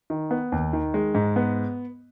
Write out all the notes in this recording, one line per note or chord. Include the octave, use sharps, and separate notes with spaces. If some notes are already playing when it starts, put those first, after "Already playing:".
D#3
B3
D#2
D#3
G#3
G#2
B3